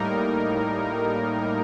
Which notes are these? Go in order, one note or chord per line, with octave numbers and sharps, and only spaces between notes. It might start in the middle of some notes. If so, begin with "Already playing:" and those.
Already playing: A2 G3 A#3 D#4 A#4